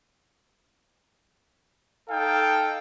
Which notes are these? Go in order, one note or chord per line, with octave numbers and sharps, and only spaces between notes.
D#4 A4 F5 G5